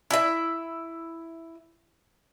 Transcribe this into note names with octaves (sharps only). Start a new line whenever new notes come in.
E4 E5